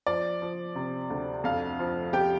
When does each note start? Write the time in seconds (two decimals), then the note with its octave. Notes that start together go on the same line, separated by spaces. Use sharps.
0.07 F3 D5
0.42 F3
0.75 C3
1.10 D2
1.44 F2 F5
1.79 F3
2.13 F2 G4 G5